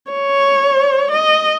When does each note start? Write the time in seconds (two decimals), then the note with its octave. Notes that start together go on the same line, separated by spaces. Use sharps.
0.12 C#5
1.12 D#5